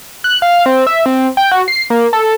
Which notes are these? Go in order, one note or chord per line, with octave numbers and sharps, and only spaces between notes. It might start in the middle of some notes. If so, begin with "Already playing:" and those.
F#6
F5
C4
E5
C4
G5
F#4
C7
A#3
A4